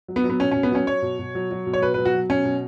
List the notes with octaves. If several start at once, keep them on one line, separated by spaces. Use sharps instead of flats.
F#3
B3
F#3
B3
B2 C#4
B2 C#4
B3
F#3 C#4
F#3 C#5
B2
B2
F#3
F#3
B2
C#5
B2 B4
F#3 B4
F#4
F#3
B2 C#4
B2